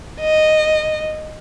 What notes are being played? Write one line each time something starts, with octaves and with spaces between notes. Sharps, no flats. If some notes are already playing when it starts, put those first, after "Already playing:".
D#5